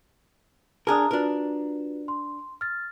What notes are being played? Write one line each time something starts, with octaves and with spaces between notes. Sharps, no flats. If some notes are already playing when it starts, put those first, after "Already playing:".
D4 G#4 A#4 A5 A#5 D#6
D4 F4 F#4 A#4 B4
C6
F6 A6